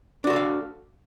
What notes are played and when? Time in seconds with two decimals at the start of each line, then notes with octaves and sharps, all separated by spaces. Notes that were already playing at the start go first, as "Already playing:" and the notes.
0.24 D4
0.27 F#4
0.30 A4
0.33 D5
0.36 F5